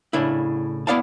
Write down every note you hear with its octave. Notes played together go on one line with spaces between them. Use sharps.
A2 C#3 D4 E4
B3 E4 D5 F5 F#5 A5